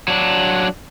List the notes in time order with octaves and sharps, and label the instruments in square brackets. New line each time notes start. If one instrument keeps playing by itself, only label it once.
[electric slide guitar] F#3 D4